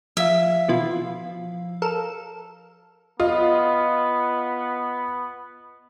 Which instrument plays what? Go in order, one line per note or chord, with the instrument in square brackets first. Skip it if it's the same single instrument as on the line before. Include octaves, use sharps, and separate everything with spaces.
[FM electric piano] F3 F5 [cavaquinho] E5
[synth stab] B2 E3 F4
A4 A#4 E7
[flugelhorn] B3 [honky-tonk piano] F4 [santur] D#5